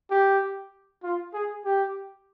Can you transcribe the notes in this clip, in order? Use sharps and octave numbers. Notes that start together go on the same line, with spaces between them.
G4
F4
G#4
G4